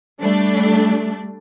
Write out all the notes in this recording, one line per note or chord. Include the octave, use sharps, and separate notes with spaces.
G3 A3 D4